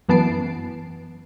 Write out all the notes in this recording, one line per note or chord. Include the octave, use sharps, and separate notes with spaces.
F#2 E3 B3 A5 C7 D7